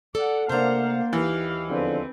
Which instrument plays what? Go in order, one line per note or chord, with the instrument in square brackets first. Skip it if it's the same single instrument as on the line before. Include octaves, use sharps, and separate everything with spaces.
[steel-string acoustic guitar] A4 [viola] D5 F#5
[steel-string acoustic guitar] C3 A3 A#5 [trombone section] A#3 [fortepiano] D4 C5 [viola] F5 F#5
[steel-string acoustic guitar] D#2 D#3 [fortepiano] E3 [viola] G4 F5
[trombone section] E2 D3 F3 [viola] C4 B4